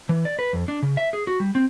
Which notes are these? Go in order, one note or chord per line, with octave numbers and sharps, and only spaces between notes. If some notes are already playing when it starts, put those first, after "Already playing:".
E3
D5
B4
F2
D4
C#3
E5
G#4
F#4
G3
C4